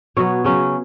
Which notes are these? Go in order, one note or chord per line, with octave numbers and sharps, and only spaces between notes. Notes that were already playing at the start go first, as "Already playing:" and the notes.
B2 F#3 B3 C#5
C#3 F#3 C#4